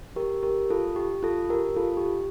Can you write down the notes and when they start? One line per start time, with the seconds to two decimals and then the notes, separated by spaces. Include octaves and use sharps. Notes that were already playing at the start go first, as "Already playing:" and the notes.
0.16 G4 A#4
0.43 G4 A#4
0.70 F4 A4
0.96 G4
1.23 F4 A4
1.49 G4 A#4
1.76 F4 A4
1.97 G4